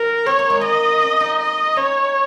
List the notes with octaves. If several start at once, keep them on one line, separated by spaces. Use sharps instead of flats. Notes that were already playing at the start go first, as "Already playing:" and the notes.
Already playing: D#3 A#4
C4 C#5
A#3
G#3
A#3 D#5
C#4
D#4
D#5
C#4 C#5